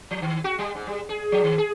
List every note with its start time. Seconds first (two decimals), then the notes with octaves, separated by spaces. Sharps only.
0.11 F3
0.22 D#3
0.44 F#4
0.59 G3
0.75 G#2
0.87 G3
1.09 G#4
1.32 F3
1.44 D#3
1.58 G#4